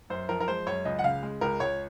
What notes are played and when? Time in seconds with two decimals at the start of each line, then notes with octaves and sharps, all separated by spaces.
0.10 F#2 C5
0.29 F3 A#4
0.40 A#4
0.48 G#3 C5
0.66 F#2 C#5
0.85 C#2 D#5
0.99 F#5
1.04 C#3 F5
1.23 G#3
1.41 C#2 A#4
1.60 C#2 C#5